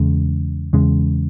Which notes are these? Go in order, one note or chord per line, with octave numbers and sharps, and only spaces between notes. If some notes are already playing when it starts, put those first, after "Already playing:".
Already playing: E2 C#3 G#3
E2 C#3 G#3